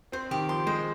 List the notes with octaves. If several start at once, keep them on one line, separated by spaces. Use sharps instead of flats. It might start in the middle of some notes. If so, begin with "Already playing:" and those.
C4 C5
D#3 G4
F3 C6
G#3 C5